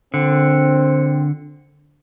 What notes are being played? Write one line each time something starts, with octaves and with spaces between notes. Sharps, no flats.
A#1 D3 C4